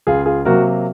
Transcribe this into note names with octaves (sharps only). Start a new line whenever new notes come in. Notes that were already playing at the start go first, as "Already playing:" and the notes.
C#2 F4 G#4
F4 G#4
C3 F#3 A#3 F#4 A#4